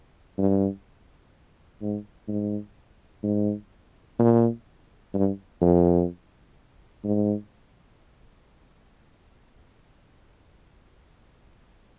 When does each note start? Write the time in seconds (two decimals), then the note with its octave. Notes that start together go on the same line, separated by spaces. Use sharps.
0.38 G2
1.82 G#2
2.28 G#2
3.24 G#2
4.19 A#2
5.14 G2
5.61 F2
7.05 G#2